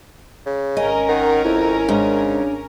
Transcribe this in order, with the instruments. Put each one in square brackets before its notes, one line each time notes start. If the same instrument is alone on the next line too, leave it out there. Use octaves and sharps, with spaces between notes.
[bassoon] C#3
[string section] G#1 C#4 A#4 [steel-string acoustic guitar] D#5 [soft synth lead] G#5
[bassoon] D#3 [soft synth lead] F#5
[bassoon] F2 [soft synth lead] E4
[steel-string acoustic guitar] G#2 [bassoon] C#3 [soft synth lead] D4